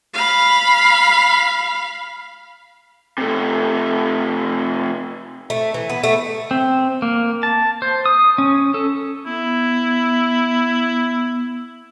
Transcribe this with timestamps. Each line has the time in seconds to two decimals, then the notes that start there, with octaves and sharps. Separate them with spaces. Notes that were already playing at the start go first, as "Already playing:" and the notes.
0.13 F5 B5
3.18 C3 A3
5.50 A3
5.74 E3
5.89 B3
6.03 A3
6.51 C4
7.02 A#3
7.43 A5
7.82 C5
8.06 D#6
8.38 C#4
8.74 A4
9.26 B3 E4